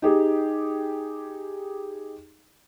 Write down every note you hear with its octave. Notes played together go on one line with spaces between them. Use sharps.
D#4 G4 G#4